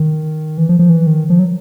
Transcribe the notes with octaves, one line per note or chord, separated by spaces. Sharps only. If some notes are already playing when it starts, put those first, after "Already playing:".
Already playing: D#3
E3
F3
F3
E3
D#3
F3
F#3